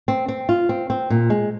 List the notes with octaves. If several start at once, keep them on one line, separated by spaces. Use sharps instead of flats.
C4
C4
F4
C4
C4
A#2
G#3